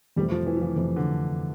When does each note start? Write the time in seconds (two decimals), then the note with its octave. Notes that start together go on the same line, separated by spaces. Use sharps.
0.16 F2 C3 E3 G3 A3 C4
0.32 F3
0.46 E3
0.56 F3
0.61 E3
0.76 F2 C3 E3 A3 C4
0.96 D3